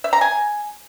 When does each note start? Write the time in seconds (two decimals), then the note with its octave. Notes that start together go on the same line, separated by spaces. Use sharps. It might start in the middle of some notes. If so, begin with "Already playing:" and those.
0.04 E5
0.13 A#5
0.21 G#5